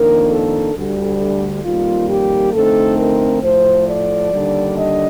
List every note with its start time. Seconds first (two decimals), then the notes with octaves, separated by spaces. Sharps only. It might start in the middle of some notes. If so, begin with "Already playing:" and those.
Already playing: F2 D#3 A#3 D4 A#4
0.31 A4
0.75 D2 D3 G3
1.64 F2 D#3 G3 A#3 F4
2.10 G4
2.54 F2 D3 A3 C4 D#4 A4
2.98 A#4
3.43 A2 F3 A3 C5
3.88 D5
4.32 D#2 D3 G3 D4
4.77 D#5